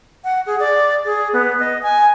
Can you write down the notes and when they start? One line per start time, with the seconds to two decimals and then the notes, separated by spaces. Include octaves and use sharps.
0.24 F#5
0.46 G#4
0.60 D5
1.05 G#4
1.33 B3
1.59 D#5
1.83 G#5